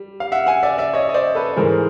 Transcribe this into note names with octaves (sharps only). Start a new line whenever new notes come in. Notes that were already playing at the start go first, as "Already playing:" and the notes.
Already playing: G3
F5
E5 F#5
F#5 G#5
D5 E5
D5 E5
C#5 D#5
D#5
C5 D5
A4 B4
G#2 E3 G#3 A#4 C5